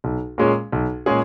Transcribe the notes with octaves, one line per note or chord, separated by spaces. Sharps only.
B1
A#2 G#3 C#4 G#4
B1
A#2 G#3 C#4 G#4